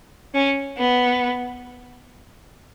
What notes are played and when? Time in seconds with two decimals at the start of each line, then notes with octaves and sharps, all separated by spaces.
0.34 C#4
0.77 B3